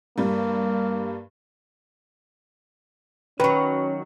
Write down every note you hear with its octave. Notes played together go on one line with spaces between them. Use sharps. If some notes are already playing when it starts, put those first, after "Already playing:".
G2 G3 A#3
D#3 F#3 C#4 B4